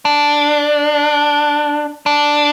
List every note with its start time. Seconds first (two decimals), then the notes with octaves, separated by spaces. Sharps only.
0.05 D4
2.06 D4